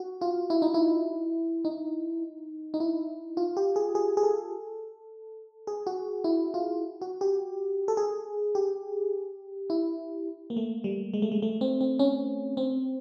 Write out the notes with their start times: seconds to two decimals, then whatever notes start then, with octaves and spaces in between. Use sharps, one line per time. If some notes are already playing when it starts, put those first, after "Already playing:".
Already playing: F#4
0.21 F4
0.50 E4
0.62 D#4
0.74 E4
1.65 D#4
2.74 D#4
2.80 E4
3.37 F4
3.57 G4
3.76 G#4
3.95 G#4
4.17 G#4
4.23 A4
5.67 G#4
5.87 F#4
6.24 E4
6.54 F4
7.02 F#4
7.21 G4
7.88 A4
7.97 G#4
8.55 G4
9.70 E4
10.50 A#3
10.57 A3
10.84 G3
11.14 G#3
11.22 A3
11.32 G#3
11.42 A3
11.61 C4
11.81 C4
11.99 C#4
12.57 C4